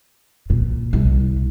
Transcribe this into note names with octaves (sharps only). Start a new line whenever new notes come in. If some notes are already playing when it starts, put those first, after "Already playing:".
A#2
C2